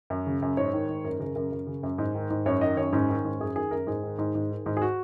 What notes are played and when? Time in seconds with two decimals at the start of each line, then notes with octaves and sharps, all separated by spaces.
0.10 F#2
0.27 C#3
0.42 F#2
0.57 G#2 C#5
0.73 D#3
0.89 G#2
1.05 F#2 A#4
1.20 C#3 A#4
1.36 F#2 A#4
1.52 F#2
1.67 C#3
1.83 F#2
1.98 G#2
2.15 D#3
2.30 G#2
2.46 F#2 C#5
2.61 D#3 D#5
2.77 F#2 C#5
2.93 G#2 C#4
3.09 D#3
3.25 G#2
3.40 F#2 G#4
3.56 D#3 G#4
3.71 F#2 A#4
3.87 G#2 G#4
4.03 D#3
4.19 G#2
4.35 G#2
4.51 D#3
4.66 G#2
4.77 G#4
4.82 F#4